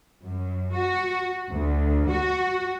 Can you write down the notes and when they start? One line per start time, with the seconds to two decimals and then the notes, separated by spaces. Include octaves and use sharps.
0.24 F#2
0.73 F#4
1.50 D2
2.07 F#4